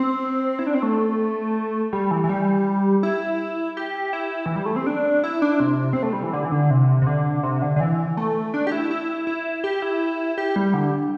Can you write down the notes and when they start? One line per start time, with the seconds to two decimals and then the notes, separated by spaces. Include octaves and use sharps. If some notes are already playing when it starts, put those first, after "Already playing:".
Already playing: C4
0.59 E4
0.67 D4
0.75 C4
0.83 A3
1.93 G3
2.11 E3
2.24 E3
2.29 G3
3.03 E4
3.77 G4
4.13 E4
4.46 E3
4.56 G3
4.66 A3
4.76 C4
4.87 D4
5.23 E4
5.42 D4
5.60 C3
5.93 C4
6.03 A3
6.13 G3
6.23 E3
6.33 D3
6.45 E3
6.52 D3
6.71 C3
7.02 C3
7.07 D3
7.43 C3
7.62 D3
7.76 D3
7.80 E3
8.17 A3
8.54 D4
8.67 G4
8.72 E4
8.91 E4
9.27 E4
9.64 G4
9.82 E4
10.38 G4
10.56 G3
10.74 D3